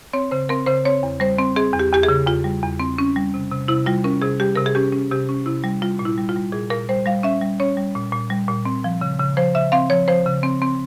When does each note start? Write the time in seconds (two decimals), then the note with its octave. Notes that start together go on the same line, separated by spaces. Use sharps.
0.13 C4 C#5
0.31 C#3 C5
0.49 C4 A#4
0.66 C#3 C5
0.85 C4 C#5
1.03 E2
1.20 G3 C5
1.39 C4
1.56 C4 G#4
1.74 E2
1.79 G4
1.92 E2 G4
2.03 G#4
2.09 C#3
2.27 E2 F4
2.44 G3
2.63 E2
2.80 C4
2.98 C#4
3.16 G3
3.34 C3
3.51 C3
3.68 C3 E4
3.86 G3 F4
4.04 C#4 A#4
4.22 C3 G#4
4.40 G3 G4
4.55 C3 A#4
4.66 G#4
4.75 C#4 G4
4.93 C#4
5.11 C3 G4
5.29 C#4
5.46 C3 E4
5.64 G3
5.82 G3 F4
5.99 A#2
6.05 E4
6.18 G3
6.29 F4
6.36 G3
6.52 A#2 G#4
6.70 A#2 A#4
6.89 G3 C5
7.06 G3 F5
7.23 C#4 E5
7.41 G3
7.60 C#4 C#5
7.77 G3
7.96 A#2
8.13 A#2
8.30 G3
8.48 A#2
8.65 C4
8.84 F3
9.01 C#3
9.19 C#3
9.37 F3 C5
9.55 C#3 E5
9.72 C4 F5
9.90 F3 C#5
10.08 F3 C5
10.26 C#3
10.43 C4
10.62 C4